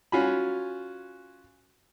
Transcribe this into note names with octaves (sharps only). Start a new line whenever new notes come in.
C#4 F4 F#4 G#5 B5